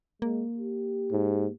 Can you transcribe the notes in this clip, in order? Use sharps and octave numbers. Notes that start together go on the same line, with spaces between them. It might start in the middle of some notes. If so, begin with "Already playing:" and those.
G#3 A#3
G4
G#2